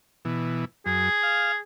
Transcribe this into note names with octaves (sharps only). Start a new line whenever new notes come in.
B2 E3
F#2 G#4
F5